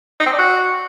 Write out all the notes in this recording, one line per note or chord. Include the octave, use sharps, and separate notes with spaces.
D#4
C4
D4
F#4